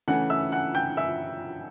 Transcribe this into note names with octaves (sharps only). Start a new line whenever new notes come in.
C#3 E3 A3 C#4 F#5 F#6
E5 E6
F#5 F#6
G5 G6
E5 E6